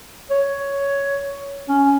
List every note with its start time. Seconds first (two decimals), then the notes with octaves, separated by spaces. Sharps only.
0.31 C#5
1.69 C#4